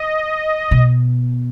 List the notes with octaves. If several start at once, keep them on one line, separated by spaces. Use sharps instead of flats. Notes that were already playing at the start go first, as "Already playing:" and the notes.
Already playing: D#5
B2